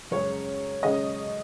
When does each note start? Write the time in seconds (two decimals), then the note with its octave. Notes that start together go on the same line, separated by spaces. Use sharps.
0.11 F#2 C#3 G#3 C#4 C#5
0.83 C#3 G#3 C#4 D#5